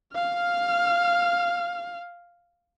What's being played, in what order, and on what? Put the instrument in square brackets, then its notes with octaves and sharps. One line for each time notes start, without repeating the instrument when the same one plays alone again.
[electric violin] F5 F6